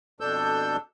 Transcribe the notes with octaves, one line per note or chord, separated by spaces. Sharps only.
F2 B2 D4 A4 E6 G6